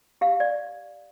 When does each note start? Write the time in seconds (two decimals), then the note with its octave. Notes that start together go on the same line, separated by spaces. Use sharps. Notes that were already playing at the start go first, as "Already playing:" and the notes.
0.21 G4 F5
0.40 D5